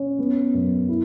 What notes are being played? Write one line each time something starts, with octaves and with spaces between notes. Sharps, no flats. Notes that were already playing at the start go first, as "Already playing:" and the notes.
Already playing: C#4
B3
F#2
E4